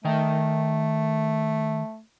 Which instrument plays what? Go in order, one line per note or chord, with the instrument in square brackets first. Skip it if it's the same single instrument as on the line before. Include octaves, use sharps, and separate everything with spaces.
[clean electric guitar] D#3 D#5 G5 [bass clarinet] A3